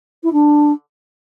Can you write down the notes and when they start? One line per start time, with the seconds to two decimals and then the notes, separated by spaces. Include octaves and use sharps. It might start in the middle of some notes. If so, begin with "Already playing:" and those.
0.23 E4
0.32 D4